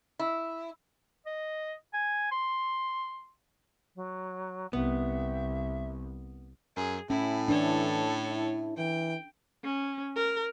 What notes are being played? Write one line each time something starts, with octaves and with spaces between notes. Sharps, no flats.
E4
D#5
G#5
C6
F#3
C2 B3 E5
F#2 G#4
A2 C#4 E4
E3 D4 A4 C#5
E4
E3 G5
C#4
A#4